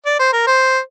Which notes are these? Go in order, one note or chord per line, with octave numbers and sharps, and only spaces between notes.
D5
C5
A#4
C5